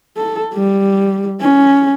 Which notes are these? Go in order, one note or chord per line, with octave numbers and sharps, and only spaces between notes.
A4
G3
C#4